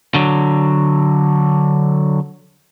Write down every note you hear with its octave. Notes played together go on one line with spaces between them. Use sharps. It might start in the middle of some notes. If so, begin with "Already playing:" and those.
D3 F#3